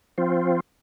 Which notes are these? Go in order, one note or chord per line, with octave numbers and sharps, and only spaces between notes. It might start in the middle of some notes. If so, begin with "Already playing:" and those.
F3 C4 F4